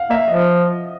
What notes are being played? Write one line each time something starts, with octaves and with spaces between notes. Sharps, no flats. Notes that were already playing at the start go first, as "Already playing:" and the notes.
Already playing: F5 F#5
A#3 E5
F3 D#5